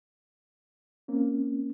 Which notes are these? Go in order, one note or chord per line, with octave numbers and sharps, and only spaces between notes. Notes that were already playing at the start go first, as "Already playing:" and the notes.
A#3 C4 C#4